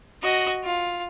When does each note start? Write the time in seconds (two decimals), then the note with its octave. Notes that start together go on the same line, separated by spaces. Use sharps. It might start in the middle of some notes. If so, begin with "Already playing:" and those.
0.23 F#4 D#5
0.64 F4